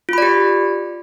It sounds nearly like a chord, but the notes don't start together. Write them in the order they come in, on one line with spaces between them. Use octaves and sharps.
F4 B5 D5 G4